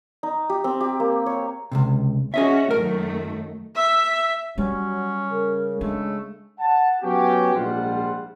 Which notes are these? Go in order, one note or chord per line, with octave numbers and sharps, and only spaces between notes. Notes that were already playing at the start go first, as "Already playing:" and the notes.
D#4
G4
C4
G4
A#3
C#5
C#2 G2 C3
C#4 F#4 G#4 D#5 E5
F#2 D#3 A3 A#4
E5
F#3 G3 C#4
C#3 A#4
G#3 A3 D4
F#5 A5
F#3 B3 C#4 F#4 G4
A#1 G#2 G3 F4 C5 F#5